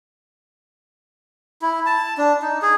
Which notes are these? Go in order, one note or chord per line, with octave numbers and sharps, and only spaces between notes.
E4
A5
D4
D#4
G#4